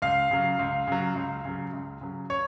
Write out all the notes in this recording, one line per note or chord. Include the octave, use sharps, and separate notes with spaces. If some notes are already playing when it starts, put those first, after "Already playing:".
C#2 F5
C#3 F#3
C#2
C#3 F#3
C#2
C#3 F#3
C#2
C#3 F#3
C#5